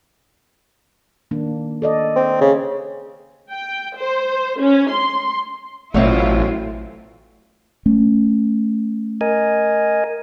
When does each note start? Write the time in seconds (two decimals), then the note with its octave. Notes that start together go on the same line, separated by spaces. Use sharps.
1.31 D#3 A#3 D4
1.82 A4 D5 D#5
2.16 C4
2.41 C#3
3.50 G5
3.98 C5
4.61 C#4
4.91 C6
5.94 A1 B2 F#3 A3 C4 E4 F4
7.86 A3 C#4
9.21 A#4 D#5 G#5